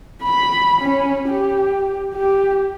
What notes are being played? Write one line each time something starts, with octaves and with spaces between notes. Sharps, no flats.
B5
C#4
G4
G4